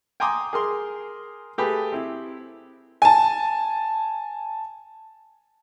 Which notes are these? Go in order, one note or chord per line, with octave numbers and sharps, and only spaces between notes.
G5 G#5 A#5 C6 D6 D#6
G#4 A#4 C6
A3 G4 G#4 B4
C4 E4
G#5 A5